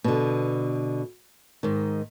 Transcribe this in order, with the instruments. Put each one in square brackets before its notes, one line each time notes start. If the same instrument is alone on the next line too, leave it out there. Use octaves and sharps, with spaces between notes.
[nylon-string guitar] B2 D3
G#2 D#3